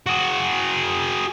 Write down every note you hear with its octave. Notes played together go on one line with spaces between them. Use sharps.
F#4 G#4